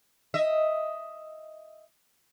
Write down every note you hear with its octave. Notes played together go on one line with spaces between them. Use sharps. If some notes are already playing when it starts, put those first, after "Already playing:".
D#5 E5